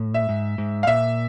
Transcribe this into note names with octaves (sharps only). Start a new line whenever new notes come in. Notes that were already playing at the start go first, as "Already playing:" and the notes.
Already playing: A2
E5
G#2
G#2
F5
A#2 E5